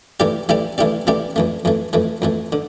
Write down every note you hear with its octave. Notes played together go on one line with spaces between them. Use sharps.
E3 A3 E4 G4 D5
E3 A3 E4 G4 D5
E3 A3 E4 G4 D5
E3 A3 E4 G4 D5
F2 E3 A3
F2 E3 A3
F2 E3 A3
F2 E3 A3
D3